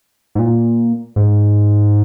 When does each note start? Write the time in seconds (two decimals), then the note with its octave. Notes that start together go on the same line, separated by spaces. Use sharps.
0.35 G#2
0.39 A#2
1.16 G#2